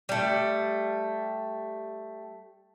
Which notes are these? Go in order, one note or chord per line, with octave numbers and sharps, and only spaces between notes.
G3 A3